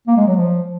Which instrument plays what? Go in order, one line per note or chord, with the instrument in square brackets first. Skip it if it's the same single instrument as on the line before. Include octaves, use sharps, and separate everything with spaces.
[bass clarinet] A#3
G#3
F#3
F3